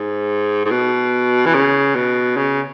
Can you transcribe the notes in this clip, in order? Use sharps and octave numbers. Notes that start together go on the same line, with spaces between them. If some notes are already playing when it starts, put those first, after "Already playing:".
Already playing: G#2
G#2
B2
E3
C#3
B2
C#3